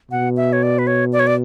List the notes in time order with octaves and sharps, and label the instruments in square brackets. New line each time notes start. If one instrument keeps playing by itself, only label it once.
[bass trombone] B2 [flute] F#5
[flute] E5
C#5
D5
B4
C#5
D5
C#5
D5